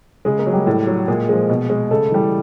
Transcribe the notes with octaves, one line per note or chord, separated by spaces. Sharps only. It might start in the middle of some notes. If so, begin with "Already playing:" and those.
C#3 G#3 G#4
A#3 A#4
F#3
G3 G4
A2
F#3
A#2 G#3 G#4
F3 G#3
B2
G#3
C#3 A3 A4
E3 G3